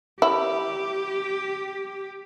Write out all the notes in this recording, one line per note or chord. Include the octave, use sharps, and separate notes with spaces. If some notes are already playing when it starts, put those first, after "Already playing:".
E4 G4